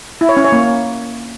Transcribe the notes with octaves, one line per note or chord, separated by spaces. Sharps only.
E4
C#5
C#4
C#5
A#3